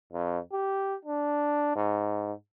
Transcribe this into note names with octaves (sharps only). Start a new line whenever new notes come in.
F2
G4
D4
G#2